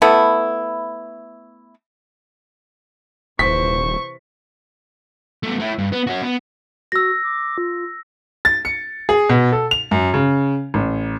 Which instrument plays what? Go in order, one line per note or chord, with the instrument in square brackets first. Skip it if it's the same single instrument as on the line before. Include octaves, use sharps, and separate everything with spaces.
[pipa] A3 B3 E4
[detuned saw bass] D#1 [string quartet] C3 E3 C5 [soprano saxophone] C#6 [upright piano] B6
[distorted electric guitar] A3 B3
A3 E4
G2
B3
C#4 F#4
B3
[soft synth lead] F#4 [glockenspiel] E6 A#6
[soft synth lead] D6
F4
[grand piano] A6
C#7
G#4
B2
A4
F7
F#2
C#3
A1